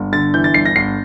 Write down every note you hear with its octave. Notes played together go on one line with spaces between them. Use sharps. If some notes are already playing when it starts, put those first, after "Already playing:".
Already playing: G1
D3 A6
E3 G6
A6
G1 C7
A#6
G1 C7